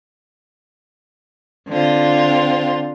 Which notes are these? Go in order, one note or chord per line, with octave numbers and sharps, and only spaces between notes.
D3 C4 F4